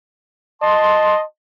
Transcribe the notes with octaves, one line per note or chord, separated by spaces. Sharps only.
D#5 A5 C6